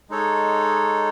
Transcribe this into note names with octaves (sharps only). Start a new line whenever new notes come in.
G#3 D#4 A4 C#5